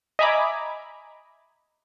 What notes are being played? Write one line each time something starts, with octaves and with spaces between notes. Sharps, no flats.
D#5 E5 G#5 A#5 B5 D6